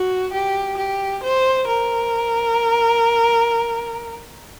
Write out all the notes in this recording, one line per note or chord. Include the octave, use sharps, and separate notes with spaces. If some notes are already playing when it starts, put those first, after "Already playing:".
Already playing: F#4
G4
G4
C5
A#4